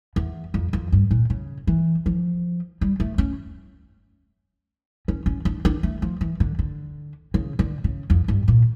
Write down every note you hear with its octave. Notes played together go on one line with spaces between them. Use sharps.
E2
F2
F2
G2
A#2
C#3
E3
F3
G3
A3
C#4
C#4
C#4
D4
D4
A3
F3
E3
D3
D3
C#3
D3
C#3
F2
G2
A#2